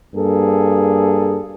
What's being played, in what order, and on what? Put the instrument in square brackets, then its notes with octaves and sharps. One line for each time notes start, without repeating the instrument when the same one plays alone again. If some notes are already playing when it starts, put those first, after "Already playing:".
[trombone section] G2 A#3 G#4 A4